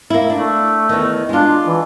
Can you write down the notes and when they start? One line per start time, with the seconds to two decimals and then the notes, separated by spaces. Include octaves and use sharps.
0.10 A#3 E4
0.30 A3 D4
0.89 E2 D#3
1.29 G#3 D4 F4
1.66 E3